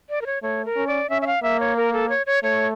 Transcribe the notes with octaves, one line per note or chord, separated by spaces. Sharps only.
D5
A#4
C#5
A3 C#5
A#4
C#4
D5
C#4 E5
E5
F5
A#3 E5
C#5
A#4
A4
C#5
C#5
A3 C#5